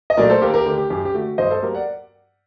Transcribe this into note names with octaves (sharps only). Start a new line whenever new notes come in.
D#5
A#2 F#3 A3 A#4 D5
A4 C5
D#2 G4 A#4
G4 A#4
D3 A3 G4
G4
F#2 G4
G4
D3 A3 F#4
G2 C5 D#5
A4 C5
F#3 A#3 G4 A#4
D5 F#5